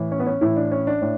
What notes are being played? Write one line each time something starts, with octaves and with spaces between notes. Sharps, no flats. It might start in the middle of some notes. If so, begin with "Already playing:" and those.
Already playing: A2 E3
C#4
B3
C#4
A2 E3 E4
D4
C#4
D4
A2